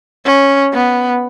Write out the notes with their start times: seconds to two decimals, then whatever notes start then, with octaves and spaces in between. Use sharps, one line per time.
0.26 C#4
0.73 B3